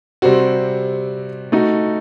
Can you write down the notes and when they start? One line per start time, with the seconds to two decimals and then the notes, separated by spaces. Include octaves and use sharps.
0.22 C3 G3 C4 F#4
1.52 A3 D#4 F#4